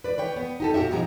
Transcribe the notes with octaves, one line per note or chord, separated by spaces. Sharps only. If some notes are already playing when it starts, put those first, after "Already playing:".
B4 D5
B4 C#5 G5
B3
D#4 G4 A4
A#2 F#4 G4 D5 E5
G2 B2 F3 G#3 D#4 A#5